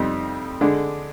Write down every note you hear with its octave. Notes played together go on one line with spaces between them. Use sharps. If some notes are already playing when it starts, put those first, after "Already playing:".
Already playing: F2 C3 G3 C4 D#4
D3 G#3 D4